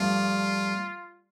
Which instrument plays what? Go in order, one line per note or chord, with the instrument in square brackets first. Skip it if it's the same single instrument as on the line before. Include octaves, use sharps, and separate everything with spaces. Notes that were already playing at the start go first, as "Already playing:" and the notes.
Already playing: [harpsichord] G2 F3 A3 D4 [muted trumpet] F4